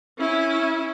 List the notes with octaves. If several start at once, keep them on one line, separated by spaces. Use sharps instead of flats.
C#4 E4